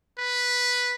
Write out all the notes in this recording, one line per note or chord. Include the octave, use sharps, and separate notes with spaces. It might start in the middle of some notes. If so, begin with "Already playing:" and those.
B4